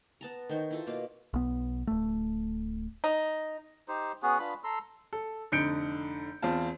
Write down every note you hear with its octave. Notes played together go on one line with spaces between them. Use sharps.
B3 A5 A#5
D#3 A#4 C5 C#6
E4 F4 A4
B2 A#3 F5 D6
B1 B3
D1 A3
D#4
D#4 G4 C5
B3 C#4 F#4 G#4
D4 F4 B4 B5
A4 A#5 C6 E6
A4
F1 D3 D#4 G6 C#7 D7
E2 C4 F4 A5